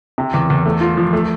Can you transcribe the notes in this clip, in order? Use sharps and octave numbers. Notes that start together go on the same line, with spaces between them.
C3
E2
E2
A3
F4
F3
A3